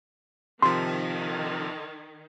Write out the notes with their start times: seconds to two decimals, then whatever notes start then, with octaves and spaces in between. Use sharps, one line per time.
0.62 C3 D#3 F3 C6